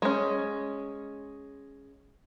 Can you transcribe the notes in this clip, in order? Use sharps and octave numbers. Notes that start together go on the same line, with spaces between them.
G#3 C#4